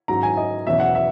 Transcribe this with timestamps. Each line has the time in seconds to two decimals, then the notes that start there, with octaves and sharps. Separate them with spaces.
0.08 G#2 F#3 C#4 A#5
0.23 G#5
0.37 D#5
0.66 E2 B2 F#3 C#4 E5
0.80 F#5
0.95 E5